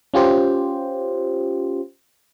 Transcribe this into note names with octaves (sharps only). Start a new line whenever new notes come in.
C#4 F4 G4 C5